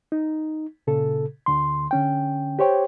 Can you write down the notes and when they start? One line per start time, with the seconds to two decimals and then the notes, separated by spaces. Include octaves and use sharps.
0.12 D#4
0.87 A#2 C#3 A4
1.46 D2 D3 C6
1.91 D3 C#4 G5
2.59 G4 C5 C#5 G5